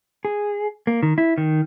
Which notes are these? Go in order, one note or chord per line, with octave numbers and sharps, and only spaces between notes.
G#4
A#3
D#3
E4
D#3